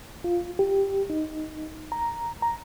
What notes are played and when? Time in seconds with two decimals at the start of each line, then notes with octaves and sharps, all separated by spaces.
0.24 F4
0.59 G4
1.10 D#4
1.92 A#5
2.42 A#5